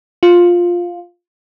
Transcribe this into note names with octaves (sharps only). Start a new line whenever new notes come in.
F4